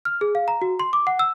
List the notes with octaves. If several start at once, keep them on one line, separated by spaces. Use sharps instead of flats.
F6
G#4
F5
A#5
F#4
C6
D6
F#5
E6